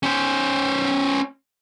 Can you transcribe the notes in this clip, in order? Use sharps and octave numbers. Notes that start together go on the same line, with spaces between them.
C#4 C5